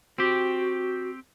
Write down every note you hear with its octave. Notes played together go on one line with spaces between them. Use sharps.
C4 F#4 G4